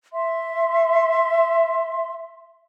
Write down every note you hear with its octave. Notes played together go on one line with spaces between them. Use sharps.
E5 C6